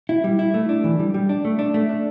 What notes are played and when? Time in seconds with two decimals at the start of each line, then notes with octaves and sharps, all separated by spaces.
0.09 E4
0.24 G3
0.39 E4
0.54 A3
0.69 D4
0.84 E3
0.99 G3
1.14 G3
1.29 D4
1.45 A3
1.59 D4
1.74 A3
1.89 D4